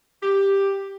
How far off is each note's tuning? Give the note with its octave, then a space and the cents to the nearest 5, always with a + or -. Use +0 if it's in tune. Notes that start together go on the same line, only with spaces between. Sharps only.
G4 +5